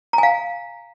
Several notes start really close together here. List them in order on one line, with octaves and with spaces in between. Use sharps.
A#5 G#5 F5